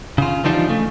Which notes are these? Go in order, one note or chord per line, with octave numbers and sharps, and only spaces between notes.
C#3 F4
E3 F3 G3 D4 D#4 F4
C#3 A3